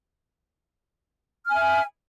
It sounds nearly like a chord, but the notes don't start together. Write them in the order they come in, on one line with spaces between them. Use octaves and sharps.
F6 G#5 E5